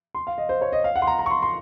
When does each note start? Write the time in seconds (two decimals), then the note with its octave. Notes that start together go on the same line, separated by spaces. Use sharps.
0.15 C6
0.27 F5
0.38 D#5
0.49 C5
0.61 C#5
0.72 D#5
0.84 F5
0.96 F#5
1.02 C6
1.07 A#5
1.19 A#5
1.26 C#6
1.31 C6
1.42 C6